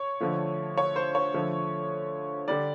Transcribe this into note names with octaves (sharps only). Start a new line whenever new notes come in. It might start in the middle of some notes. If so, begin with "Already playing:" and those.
Already playing: C#5
D3 F3 A3
C#5
C5
C#5
D3 F3 A3
D3 G3 D5